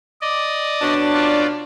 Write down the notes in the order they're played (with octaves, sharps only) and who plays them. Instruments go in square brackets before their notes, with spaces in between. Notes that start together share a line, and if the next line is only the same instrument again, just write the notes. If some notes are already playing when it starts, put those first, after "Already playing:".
[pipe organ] D5 D#5
[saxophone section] B2 C#4 D4
[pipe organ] F4 D5